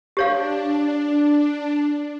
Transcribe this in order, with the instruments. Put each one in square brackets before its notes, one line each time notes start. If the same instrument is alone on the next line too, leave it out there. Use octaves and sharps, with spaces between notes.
[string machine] D4 [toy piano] G4 C#5 F5